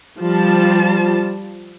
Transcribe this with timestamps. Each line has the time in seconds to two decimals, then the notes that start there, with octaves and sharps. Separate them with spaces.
0.21 F3 G3 F4 A5